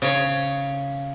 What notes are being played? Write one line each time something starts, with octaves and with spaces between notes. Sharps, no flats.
C#3 C#5